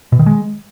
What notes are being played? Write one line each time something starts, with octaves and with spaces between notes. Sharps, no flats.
B2
D#3
G#3